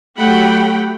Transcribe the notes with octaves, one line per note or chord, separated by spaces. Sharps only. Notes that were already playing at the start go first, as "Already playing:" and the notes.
F#3 A3 G4 F#5 G5 B5